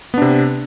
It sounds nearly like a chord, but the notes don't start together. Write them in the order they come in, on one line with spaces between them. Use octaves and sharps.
B3 D4 C3